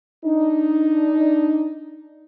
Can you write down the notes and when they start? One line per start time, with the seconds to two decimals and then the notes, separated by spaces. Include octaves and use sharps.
0.25 D4 D#4